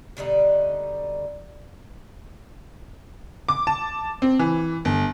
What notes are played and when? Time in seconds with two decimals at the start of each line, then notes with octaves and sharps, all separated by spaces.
0.17 B2 D3 G3 D#4
3.49 D6
3.67 A5
4.22 C4
4.39 E3
4.85 G1